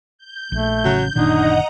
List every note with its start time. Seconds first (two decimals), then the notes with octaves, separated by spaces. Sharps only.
0.18 G6
0.52 A#1 A3
0.85 A1 C#3 F#3
1.16 F#1 A#2 D3 D#3 D#4 D#5 F#5 A#5